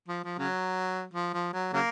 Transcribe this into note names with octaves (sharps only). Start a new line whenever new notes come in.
F3
F3
C#3 F#3
F3
F3
F#3
C#3 F#3 A#3